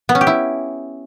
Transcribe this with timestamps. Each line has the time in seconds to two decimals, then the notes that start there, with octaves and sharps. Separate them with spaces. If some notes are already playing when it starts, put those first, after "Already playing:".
0.09 B3
0.15 C#4
0.21 G4
0.27 E4